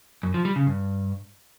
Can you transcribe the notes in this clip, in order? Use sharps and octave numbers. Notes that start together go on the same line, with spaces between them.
F#2
F3
G3
C#3
G2